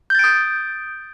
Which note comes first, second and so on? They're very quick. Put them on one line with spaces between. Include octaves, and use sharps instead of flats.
G6 A6 D7 D#6